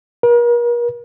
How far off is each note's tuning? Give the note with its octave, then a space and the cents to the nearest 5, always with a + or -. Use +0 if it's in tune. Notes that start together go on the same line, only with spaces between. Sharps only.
A#4 +40